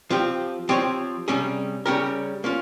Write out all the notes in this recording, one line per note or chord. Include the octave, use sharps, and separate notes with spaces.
F3 C4 G4
F3 C4 G4 C#5
C3 G3 C#4 G#4
C#3 G3 C#4 G4 A#4
A#3 C#4 F4